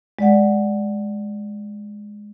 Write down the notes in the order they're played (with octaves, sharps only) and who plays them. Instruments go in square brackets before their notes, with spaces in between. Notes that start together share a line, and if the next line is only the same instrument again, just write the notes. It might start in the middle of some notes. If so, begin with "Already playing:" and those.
[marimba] G#3 D5 F#5